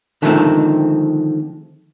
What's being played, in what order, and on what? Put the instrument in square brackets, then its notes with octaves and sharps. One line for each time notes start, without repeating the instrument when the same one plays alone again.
[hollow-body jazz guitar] D3 D#3 F3 G#3 A3 C4